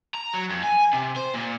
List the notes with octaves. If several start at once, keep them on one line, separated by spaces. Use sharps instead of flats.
A#5
F#3
F2
G#5
C3
C5
A#2